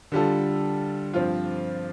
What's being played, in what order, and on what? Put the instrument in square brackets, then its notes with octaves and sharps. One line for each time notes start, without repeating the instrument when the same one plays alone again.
[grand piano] D3 G3 F4 A4
G2 F3 C4 F4